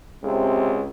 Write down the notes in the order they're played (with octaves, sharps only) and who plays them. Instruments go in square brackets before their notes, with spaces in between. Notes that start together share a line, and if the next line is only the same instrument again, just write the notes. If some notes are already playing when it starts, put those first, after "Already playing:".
[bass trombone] C#2 [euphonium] C3